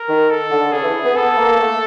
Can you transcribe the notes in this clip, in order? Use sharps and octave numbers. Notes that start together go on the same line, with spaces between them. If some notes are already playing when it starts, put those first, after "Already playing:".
Already playing: A#4
D#3
A4
D3
C#3 G#4
E3
B3
B3 A4
A#3
A3